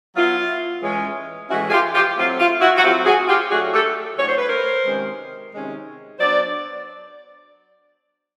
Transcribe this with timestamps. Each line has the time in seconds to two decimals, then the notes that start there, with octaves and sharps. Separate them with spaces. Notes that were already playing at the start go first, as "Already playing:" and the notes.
0.15 F#3 B3 E4 F4
0.82 A2 E3 G#3 C#4
1.49 A2 E3 G#3 C#4 E4 F#4
1.67 G#4
1.71 F4 G4
1.94 F4 G4
2.16 F#3 A3 C4 E4 F4
2.39 F4
2.61 E4 F#4
2.77 F#4
2.83 F#3 A3 C4 E4 F4 G4
3.05 F#4 G#4
3.28 F4 G4
3.51 A2 F#3 A3 D4 F#4 G#4
3.73 G4 A4
4.18 A2 F#3 A3 D4 C#5
4.28 C5
4.37 B4
4.47 A#4 C5
4.85 C3 D#3 G#3 C#4
5.52 C3 D#3 G#3 C#4
6.19 F#3 B3 D4 C5 D5